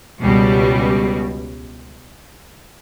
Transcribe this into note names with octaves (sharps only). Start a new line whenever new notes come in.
C#2 B2 G3